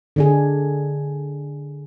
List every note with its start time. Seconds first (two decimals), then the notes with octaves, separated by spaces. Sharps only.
0.16 D3 D4 G#4